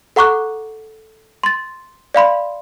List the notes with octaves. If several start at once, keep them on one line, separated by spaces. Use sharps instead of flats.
A4 F#5 A#5 C#6 D6 F#6
C6 A6
D5 F5 B5 C6